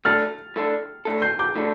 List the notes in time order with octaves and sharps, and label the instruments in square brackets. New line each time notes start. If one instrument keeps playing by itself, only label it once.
[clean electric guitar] A2 A3 D4 A4 [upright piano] F6 A6
[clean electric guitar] A2 A3 D4 A4
A2 A3 D4 A4
[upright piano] G6 C7
D6 G6
[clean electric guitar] A2 A3 D4 A4